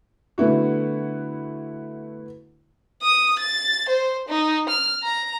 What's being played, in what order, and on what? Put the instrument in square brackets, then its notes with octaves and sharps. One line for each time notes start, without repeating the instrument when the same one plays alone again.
[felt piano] D3 A3 B3 E4 F#4
[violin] D#6
A6
C5
D#4
F6
A#5